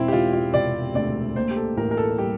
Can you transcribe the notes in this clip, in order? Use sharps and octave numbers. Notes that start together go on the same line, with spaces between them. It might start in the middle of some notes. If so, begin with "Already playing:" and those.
Already playing: E1 C4 E4
G4
E1 F4
F4
C3 D5
D2 D5
A#3 C5
G4
A4
A1 A#4
A#4
A4
G3 G4